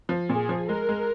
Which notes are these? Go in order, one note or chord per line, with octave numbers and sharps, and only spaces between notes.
F3
A#2 G#4
F3
G#3 A#4
G#3